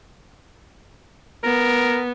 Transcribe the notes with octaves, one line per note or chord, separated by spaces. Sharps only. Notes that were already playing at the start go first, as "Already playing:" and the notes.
B3 A#4